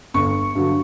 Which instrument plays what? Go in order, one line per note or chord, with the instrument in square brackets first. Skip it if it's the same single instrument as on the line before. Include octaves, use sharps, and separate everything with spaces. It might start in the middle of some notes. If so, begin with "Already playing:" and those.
[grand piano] G1 C#6
G2 D3 F#3